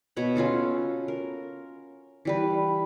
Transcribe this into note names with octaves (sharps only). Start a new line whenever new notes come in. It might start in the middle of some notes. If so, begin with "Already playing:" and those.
B2 C#5 F#5 B5
C#4 F4 F#4 A4
A#4
E3 G3 B4